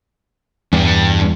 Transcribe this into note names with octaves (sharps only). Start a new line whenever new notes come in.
E2 G2